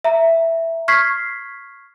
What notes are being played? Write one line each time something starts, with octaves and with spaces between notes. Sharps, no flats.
E5 A#5
C#6 F6 G#6 B6 C7